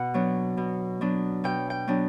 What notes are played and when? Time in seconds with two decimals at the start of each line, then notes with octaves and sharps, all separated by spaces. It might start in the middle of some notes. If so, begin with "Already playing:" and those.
Already playing: B2 F#5
0.14 F#3 B3 D4
0.57 B2
1.01 F#3 B3 D4
1.44 B2 G5
1.70 G5
1.88 F#3 B3 D4